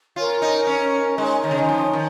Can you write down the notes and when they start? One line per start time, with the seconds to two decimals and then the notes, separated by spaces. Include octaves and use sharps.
0.16 F4 A#4 C#5 G#5
0.42 D#4
0.67 C#4
1.18 G#3 D#4 C#5 G#5
1.44 D#3
1.51 C#3
1.59 D#3
1.69 F3
1.93 D#3